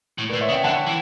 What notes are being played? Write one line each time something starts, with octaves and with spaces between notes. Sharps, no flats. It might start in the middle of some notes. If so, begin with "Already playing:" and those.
A2
B4 D5
A2
C#5 E5
C#3
E5 G5
D3 F#5 A5
E3